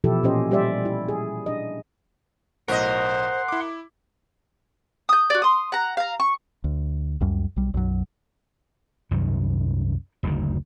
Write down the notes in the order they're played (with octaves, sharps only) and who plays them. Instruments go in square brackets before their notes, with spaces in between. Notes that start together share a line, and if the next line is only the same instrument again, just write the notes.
[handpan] B2 E3 F3 E4 G4 A4
A#2 C#4 G4 C5 D#5
G3 G4 C5 D5 E5
E4
G#4
D4 D#5
[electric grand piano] B1 A2 [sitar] A#4 D#5 [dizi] C5 [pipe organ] F#5 C6
[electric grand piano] E4 D6
[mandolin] D#6 G6
F#4 D5
C6 D#6
F#5 A#5
F5 A#5
C#6
[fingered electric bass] D2
C#2 F#2 G3
B1 G3
B1 F#2 F#3
[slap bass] C2 F#2 D#3
F#1 D2 C3 D#3